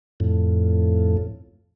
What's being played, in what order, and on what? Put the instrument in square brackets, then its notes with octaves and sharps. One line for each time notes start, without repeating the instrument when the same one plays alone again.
[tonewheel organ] F2 A2